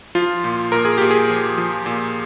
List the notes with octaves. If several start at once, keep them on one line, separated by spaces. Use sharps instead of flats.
F3 F4
A#2
A#2 A#4
G#4
A#2 G4
G#4
F3
F3
A#2